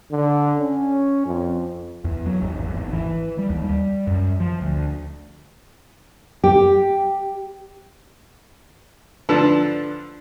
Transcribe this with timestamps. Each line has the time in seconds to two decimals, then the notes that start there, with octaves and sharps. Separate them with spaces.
0.12 D3
0.59 C#4
1.26 F2
2.04 E2
2.26 F#3
2.42 G#1
2.60 E2
2.76 G#1
2.93 E3
3.38 G3
3.50 D#2
3.63 G3
4.07 F#2
4.40 F3
4.61 D2
6.44 G4
9.29 D3 F3 D4 A4 B4